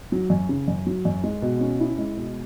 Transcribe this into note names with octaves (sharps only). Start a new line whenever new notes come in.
F#3
F#2
C#3
F#2
F#3
F#2
G#3
B2
C#4
E4
G#3
B2